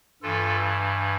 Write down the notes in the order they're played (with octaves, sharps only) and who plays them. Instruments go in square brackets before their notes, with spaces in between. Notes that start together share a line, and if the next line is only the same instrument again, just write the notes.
[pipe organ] G2 E3 F4 A4